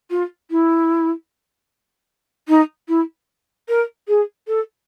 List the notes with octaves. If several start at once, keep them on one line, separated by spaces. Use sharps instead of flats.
F4
E4
D#4
E4
A#4
G#4
A4